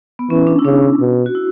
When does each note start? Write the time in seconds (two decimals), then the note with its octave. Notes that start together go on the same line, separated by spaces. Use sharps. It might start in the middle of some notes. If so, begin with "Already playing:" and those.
0.19 B3
0.30 E3 C#4
0.47 D4
0.59 E4
0.65 C#3 D4
1.00 B2
1.26 F#4
1.35 E4